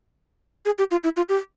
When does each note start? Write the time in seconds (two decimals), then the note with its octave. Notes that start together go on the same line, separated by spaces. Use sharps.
0.65 G#4
0.78 G4
0.91 F4
1.04 E4
1.17 F4
1.29 G4